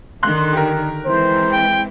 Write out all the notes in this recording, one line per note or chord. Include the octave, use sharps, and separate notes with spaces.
D3 D#3 C6 F#6
G4 A#4
E3 G#3 C4 C5
G5